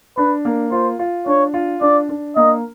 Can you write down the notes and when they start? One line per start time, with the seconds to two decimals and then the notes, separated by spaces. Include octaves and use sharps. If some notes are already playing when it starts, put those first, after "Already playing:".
0.17 D4 B4
0.45 A#3
0.72 F4 C5
0.99 F4
1.26 D4 C#5
1.54 F4
1.81 D4 D5
2.09 D4
2.36 A#3 D#5